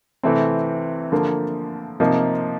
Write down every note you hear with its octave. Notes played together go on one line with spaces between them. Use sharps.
C3 E3 A3 C4
D3 F3 A#3
C3 F3 A#3 D#4